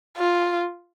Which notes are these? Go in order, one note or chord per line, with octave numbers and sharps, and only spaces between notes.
F4